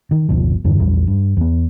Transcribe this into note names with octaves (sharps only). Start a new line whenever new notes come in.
D#3
F#1 D2 B2 F3
E2 G2 D3 E3
A#1 E2 G3
G2
E2 B3